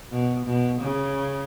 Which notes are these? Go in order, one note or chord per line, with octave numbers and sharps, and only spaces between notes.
B2
B2
C#3